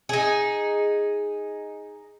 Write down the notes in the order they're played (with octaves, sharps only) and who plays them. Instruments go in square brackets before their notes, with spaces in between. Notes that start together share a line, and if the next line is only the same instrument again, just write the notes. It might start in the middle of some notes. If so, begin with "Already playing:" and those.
[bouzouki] D#4 G#4